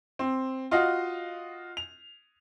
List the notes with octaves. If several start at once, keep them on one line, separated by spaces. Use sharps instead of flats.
C4
F4 F#4 D#5 F5
F7